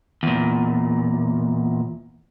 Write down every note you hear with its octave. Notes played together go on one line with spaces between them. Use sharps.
E2 A#2